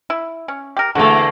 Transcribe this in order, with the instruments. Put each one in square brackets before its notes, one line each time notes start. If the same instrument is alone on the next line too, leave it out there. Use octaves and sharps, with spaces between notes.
[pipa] E4
C#4
G4 A#4
[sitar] E2 A#3 A4 [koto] D3 A3 [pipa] F#4